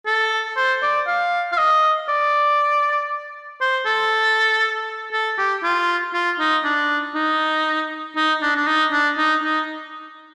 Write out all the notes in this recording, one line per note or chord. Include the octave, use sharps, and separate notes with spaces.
A4
C5
D5
F5
F5
D#5
D5
C5
A4
A4
G4
F4
F4
D#4
D4
D#4
D#4
D4
D4
D#4
D4
D#4
D#4